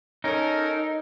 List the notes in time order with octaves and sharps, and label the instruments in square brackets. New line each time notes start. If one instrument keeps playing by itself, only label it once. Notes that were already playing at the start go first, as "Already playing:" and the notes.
[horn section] C#4 A4 A#4 [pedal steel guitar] D#4